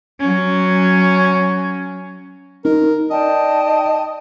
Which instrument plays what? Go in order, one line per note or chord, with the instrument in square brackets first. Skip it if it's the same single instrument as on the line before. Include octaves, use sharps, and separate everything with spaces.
[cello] F#3 C#4
[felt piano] D#4 [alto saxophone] A#4
[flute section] D5 G5 A5 [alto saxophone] D#5